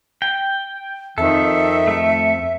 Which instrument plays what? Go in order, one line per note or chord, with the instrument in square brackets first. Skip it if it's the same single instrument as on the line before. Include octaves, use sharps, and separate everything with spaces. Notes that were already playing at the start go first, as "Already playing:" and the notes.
[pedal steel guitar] G5
[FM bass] F2 [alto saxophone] D#3 [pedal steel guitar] A4 [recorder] E5
[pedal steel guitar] A3 A4